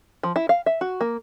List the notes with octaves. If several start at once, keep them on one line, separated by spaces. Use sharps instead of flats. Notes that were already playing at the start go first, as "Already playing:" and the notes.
F3
E4
F5
E5
F#4
A#3